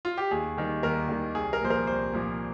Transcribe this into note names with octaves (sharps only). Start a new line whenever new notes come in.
F4
G4
D#2 G#4
D#3 G3 A#3
D#2 A#4
D#3 G3 A#3
C2 G#4
A#4
A#2 F3 A#3 C5
A#4
C2 C5
A#2 F3 A#3